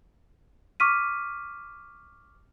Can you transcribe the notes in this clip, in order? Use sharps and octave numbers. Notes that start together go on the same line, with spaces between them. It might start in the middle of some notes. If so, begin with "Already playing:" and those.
C#6 D6 F6 B6 D#7